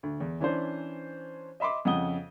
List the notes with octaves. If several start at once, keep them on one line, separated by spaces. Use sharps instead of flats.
D2
E2
E3 C#4 D4 C5
D#5 E5 B5 C6 D6
F2 C#3 D#5 F#5 D#6 G7